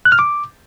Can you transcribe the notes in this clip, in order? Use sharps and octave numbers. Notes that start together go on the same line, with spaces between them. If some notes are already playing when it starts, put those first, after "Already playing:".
F#6
F6
D6